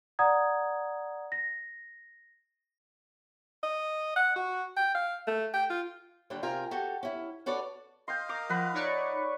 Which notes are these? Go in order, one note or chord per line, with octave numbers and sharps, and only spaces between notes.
D5 F#5 A#5 D#6 G#6
A#6
D#5
F#5
F#4
G5
F5
A3
G5
F4
D#2 D3 G3 D4
C3 F4 A#4 G5 G#5 A#5
F#4 G4 A4
C#4 E4
F#4 A4 B4 C#5 D5 F#5
D#5 F5 G5 C6
A#4 D6
F3 B4 F#5
D#4 C#5 D5 C#6